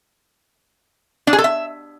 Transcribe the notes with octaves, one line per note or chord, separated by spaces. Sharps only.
D4
G#4
A4
E5